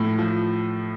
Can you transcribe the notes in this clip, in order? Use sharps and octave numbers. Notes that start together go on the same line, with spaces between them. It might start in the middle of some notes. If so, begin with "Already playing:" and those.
Already playing: A2 F3
F3